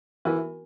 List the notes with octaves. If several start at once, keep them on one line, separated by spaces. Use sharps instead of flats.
E3 F#4 A#4